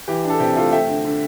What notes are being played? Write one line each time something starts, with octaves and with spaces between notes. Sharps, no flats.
E3 G4
D4
A4
C3 G4
A3 F4 A4
A3 E5 G5
D3
D3